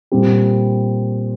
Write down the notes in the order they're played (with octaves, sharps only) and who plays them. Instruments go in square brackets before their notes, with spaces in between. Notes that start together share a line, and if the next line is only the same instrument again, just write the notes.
[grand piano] A#2 G3 C4 G4